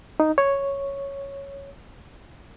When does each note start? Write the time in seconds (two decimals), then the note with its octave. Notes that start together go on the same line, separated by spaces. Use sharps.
0.20 D#4
0.38 C#5